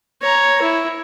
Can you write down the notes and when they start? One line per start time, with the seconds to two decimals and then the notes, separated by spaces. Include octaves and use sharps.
0.22 C#5 A#5
0.62 E4